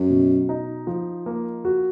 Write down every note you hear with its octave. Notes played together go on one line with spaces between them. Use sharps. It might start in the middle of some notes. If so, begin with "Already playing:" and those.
Already playing: F#2
B2
D#4
F3
A#3
F#4